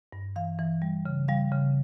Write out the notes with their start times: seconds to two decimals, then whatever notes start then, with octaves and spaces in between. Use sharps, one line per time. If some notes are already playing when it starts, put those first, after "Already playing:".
0.13 G2
0.36 E3 F5
0.59 E3
0.82 G3
1.06 C#3
1.28 G3 F5
1.52 C#3